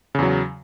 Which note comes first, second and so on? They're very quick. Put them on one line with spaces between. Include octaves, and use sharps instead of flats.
C#3 E2 F#3